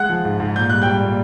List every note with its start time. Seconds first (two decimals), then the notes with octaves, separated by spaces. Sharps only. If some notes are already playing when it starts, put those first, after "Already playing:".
Already playing: G#3 F#5 F#6
0.09 F3
0.25 G#2
0.40 G#2
0.56 A#2 G6
0.69 G3 F#6
0.82 G3 G5 G6
1.02 A#2